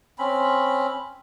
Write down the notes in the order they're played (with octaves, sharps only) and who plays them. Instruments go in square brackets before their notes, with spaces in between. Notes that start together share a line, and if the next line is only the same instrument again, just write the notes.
[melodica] C4 C#4 B5